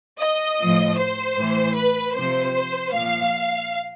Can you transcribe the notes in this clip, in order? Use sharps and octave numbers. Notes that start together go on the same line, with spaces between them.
D#5
A2 F3
C5
A2 E3
B4
C3 F3 C5
A#2 F3 F5